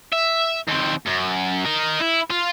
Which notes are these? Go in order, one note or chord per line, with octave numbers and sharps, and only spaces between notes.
E5
D#2 C4
F#2
D#4 A#4
E4
F4